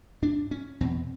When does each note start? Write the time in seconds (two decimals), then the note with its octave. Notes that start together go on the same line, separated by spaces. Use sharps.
0.22 G#2 D4
0.51 C#4
0.81 E2 B2 C4